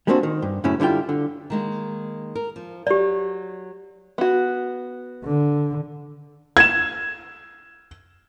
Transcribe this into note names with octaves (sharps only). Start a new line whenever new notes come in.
G3 G#3 A#3 C4 D4 F#4
D#3
G2
F#2 A2 C#3 C#4 E4
D3 G3 E4 F4 G5
D3
D#3 G#3 A#3
A#4
F3
F#3 G4 D5
B3 F#4
D3
G#6 E7